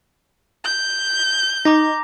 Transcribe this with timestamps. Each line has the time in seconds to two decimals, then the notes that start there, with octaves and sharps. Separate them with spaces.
0.65 G6
1.65 D#4 A#5 D6 A#6